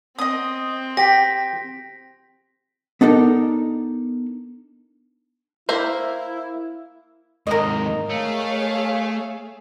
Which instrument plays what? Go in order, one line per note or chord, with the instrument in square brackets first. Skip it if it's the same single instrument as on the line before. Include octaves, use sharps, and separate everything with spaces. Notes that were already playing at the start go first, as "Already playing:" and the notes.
[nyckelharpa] C4 [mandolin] D#5 D#6
[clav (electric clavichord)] G4 [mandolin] G5 [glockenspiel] A#6 B6
[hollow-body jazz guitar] B3 D4 D#4 A4 A#4
[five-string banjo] A#3 C5 E5 [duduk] E4
[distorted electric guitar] D#2 G#2 [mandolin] A#4 D#5
[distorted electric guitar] A3 [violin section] G#4 C#5 F5